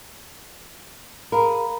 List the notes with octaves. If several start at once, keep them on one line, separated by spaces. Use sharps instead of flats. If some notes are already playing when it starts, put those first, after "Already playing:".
G#4 A#4 F5 A#5 B5